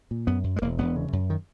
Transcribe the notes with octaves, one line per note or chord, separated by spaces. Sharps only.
A#2
F#2 B3
F#2
G#3
E1 A#3
E1 B3
C#3
F#2
D#3